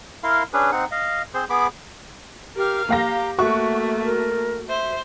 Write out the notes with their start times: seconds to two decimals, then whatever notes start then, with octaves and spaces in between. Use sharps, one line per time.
0.24 E4 A#4 F5 C6
0.53 C#4 D4 G#4 B4
0.72 C4 D#4 F#5
0.91 D#5 F5
1.34 C4 G#4 C5 C6
1.50 B3 G#4 B5 D6
2.56 G4 A#4 F5
2.89 A#3 G4 F5 A#5 A#6
3.38 A3 A#3 F#4 E5 C#6 F#6
4.05 A#4
4.69 C5 E5